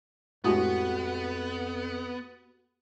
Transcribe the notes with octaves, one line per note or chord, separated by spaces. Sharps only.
F2 A2 G#3 B3 F#4 G4 D#6